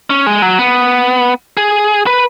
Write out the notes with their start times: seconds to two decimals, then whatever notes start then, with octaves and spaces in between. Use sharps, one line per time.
0.10 C#4
0.26 G#3
0.42 F#3
0.59 B3
1.57 G#4
2.07 B4